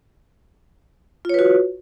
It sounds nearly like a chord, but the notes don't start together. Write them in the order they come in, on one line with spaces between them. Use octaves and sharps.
F4 C#5 B4 F#4